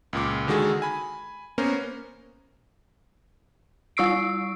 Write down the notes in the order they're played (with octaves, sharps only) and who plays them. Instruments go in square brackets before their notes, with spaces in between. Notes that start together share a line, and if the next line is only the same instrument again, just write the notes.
[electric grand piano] C#2 A#2 D6
D3 D#3 G#3 F#4 G#4 A4
G#5 B5
A#3 B3 C#4 A#4 C5
[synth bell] G3 F4 C#6 E6 C7 D7